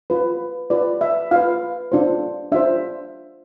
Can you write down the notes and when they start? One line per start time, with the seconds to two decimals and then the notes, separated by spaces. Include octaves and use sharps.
0.10 F4 B4
0.70 F4 B4 D5
1.01 E5
1.31 F4 B4 F5
1.92 D4 F4 C5
2.52 D4 F4 C5 E5